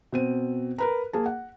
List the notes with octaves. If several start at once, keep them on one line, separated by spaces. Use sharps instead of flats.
B2 C4 D#7
A#4 B4 A#5
A#3 G#4 A5
F#5